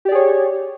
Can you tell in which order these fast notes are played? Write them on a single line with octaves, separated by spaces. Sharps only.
G4 D5 G#4 C#5